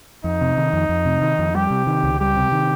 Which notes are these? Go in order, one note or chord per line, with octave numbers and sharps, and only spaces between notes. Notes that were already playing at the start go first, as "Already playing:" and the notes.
F2 D#4
C3
D#3
F2
F2
C3
D#3
F2
G3 G4
C3
D#3
C#2
G3 G4
C3
D#3